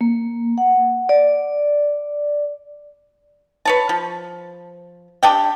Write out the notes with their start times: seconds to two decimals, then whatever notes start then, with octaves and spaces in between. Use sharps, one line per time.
0.01 A#3
0.58 F#5
1.09 D5
3.65 B4 C#5 A5
3.89 F3
5.23 D4 G4 G5